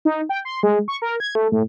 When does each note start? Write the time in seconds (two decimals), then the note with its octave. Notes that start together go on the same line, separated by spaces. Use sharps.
0.05 D#4
0.29 G5
0.45 C6
0.63 G#3
0.88 C#6
1.02 A#4
1.20 G#6
1.35 A3
1.52 A2